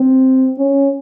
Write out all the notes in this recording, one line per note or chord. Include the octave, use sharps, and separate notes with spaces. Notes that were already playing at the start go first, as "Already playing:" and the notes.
Already playing: C4
C#4